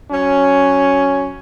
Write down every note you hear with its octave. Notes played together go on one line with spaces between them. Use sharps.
F#3 C#4